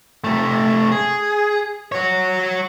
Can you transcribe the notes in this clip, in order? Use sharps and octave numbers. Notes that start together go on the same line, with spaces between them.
C3 A3
G#4
F#4 C#5